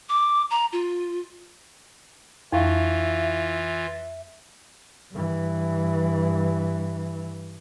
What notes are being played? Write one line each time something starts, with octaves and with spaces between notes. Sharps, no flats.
D6
A#5
F4
F2 E3 E4 F4 E5 F5 C#6
G2 E3